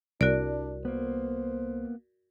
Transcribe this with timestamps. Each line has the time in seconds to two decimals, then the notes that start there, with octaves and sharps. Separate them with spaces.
0.21 C2 D4 F#4 A#4 D5
0.85 A#3 B3 C5